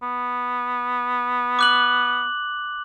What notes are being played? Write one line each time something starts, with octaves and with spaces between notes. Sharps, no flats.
B3
D6 F#6 F#7